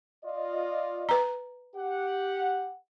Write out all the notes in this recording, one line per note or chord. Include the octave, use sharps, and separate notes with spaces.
F4 D5 D#5
B4 A#5
G4 F#5